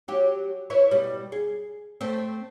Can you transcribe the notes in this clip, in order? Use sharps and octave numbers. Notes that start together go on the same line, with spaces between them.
F#3 G4
E4 B4 C#5
B2 G3
G#4
A3 C4